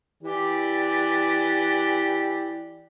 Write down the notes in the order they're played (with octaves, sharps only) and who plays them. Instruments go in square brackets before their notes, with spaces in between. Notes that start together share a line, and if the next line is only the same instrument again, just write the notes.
[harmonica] E3 G4 D5